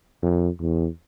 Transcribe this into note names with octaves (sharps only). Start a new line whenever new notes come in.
F2
E2